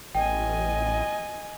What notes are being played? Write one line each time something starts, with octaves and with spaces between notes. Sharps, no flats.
A1 D#5 G5 G#5